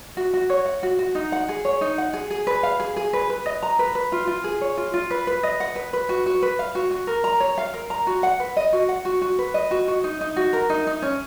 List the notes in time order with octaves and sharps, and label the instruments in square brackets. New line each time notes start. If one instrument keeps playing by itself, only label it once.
[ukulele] F#4
F#4
C#5
F#5
F#4
F#4
D#4
F#5
G#4
C#5
D#4
F#5
G#4
G#4
B4
F5
G#4
G#4
B4
B4
D#5
A#5
B4
B4
F4
F4
G#4
C#5
F4
F4
B4
B4
D#5
F#5
B4
B4
F#4
F#4
B4
F5
F#4
F#4
A#4
A#5
C#5
F5
A#4
A#5
F#4
F#5
B4
D#5
F#4
F#5
F#4
F#4
B4
D#5
F#4
F#4
D#4
D#4
F#4
A#4
D#4
D#4
C#4